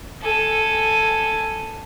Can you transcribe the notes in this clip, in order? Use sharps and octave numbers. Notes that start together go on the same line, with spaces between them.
A4 G#5